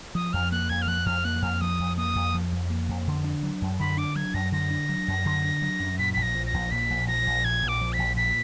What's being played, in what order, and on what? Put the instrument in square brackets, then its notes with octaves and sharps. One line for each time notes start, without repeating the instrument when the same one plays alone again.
[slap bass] F3 [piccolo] D#6
[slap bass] F2 [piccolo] F6
[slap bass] A#3 [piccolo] F#6
[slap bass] F2 [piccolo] G#6
[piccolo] F6
[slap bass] F3 [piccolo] F#6
[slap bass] F2 [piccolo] F6
[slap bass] A#3 [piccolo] F#6
[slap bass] F2 [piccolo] F6
[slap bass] F3 [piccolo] D#6
[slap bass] F2
[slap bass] A#3 [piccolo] D#6
[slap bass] F2
F3
F2
A#3
F2
D3
D4
F#3
F#2
[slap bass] D3 [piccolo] B5
[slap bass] D4 [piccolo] D6
[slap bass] F#3 [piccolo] G#6
[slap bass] F#2 [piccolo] A#6
[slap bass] D3 [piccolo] A#6
[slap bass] D4
F#3
F#2
D3
D4
F#3
F#2
[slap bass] A#2 [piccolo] B6
[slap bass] A#1 [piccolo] B6
[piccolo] A#6
[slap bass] F3
[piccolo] A#6
[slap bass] A#1
[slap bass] A#2 [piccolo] B6
[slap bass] A#1
[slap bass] F3 [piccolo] A#6
[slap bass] A#1
[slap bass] A#2 [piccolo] G#6
[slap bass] A#1
[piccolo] D6
[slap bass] F3
[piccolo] B6
[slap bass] A#1
[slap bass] A#2 [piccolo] B6